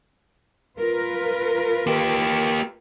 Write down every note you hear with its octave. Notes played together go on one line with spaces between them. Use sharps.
F4 A#4 B4
A#3 G4